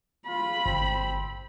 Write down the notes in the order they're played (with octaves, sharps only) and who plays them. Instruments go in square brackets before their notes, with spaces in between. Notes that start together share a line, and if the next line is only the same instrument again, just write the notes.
[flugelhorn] F4 [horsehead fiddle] B5
[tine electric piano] G1 [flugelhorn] C4